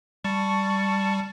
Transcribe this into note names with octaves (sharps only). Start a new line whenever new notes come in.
G3 A5 C#6